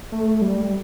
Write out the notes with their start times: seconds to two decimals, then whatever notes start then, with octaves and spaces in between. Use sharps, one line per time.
0.12 A3
0.42 G3